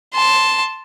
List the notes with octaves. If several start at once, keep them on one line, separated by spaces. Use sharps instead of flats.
A5 C6